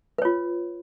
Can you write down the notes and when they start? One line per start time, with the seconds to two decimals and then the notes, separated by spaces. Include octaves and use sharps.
0.18 B4
0.22 C#5
0.25 F4